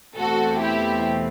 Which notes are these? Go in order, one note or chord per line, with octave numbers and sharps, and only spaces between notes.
E2 B2 A3 C4 F#4 A4
E4 G4